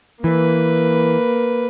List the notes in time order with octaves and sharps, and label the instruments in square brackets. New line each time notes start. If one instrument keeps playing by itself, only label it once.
[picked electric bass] E3 [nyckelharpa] A#3 B4